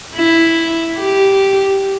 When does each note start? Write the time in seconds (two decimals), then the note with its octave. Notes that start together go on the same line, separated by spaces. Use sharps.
0.16 E4
0.99 G4